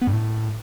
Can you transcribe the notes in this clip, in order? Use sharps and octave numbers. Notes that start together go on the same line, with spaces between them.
B3
G2
A2